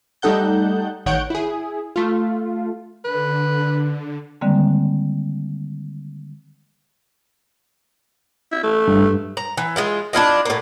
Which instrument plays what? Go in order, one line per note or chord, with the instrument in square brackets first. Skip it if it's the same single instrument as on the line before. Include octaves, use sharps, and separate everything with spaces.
[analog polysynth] G3 A3 D#4 A4 F#5 G6
A1 D#3 C#5 F#5 G6 D7
E4 G#4
A3 F4
[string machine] D3 [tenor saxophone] B4
[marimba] D3 D#3 G3 G#3 A#3 C4
[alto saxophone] E4
A3
[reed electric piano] G2
[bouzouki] A#5
E3
G#3 E4 F4
D4 E4 F4 D#5
A2 A#3